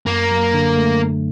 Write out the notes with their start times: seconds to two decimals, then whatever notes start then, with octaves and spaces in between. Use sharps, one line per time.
0.06 F#2 A#3
0.31 F#3
0.54 D3
0.77 A3